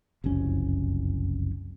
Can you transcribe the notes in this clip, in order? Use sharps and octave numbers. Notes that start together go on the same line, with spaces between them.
F#1 C2 F2 C#4